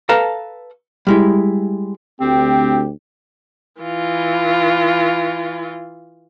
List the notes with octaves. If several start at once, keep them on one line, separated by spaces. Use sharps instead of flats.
A4 B4 F5 A5 A#5
G3 G#3 E4
D2 C4 G4
E3 F4